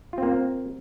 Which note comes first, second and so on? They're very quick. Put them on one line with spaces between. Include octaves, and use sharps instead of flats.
F4 C4 A#3